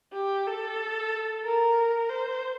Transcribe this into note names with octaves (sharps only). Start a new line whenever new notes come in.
G4
A4
A#4
C5